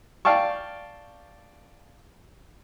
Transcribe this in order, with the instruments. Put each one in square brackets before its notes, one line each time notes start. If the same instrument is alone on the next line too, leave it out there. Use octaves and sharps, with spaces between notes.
[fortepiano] D5 F5 G5 A5 C#6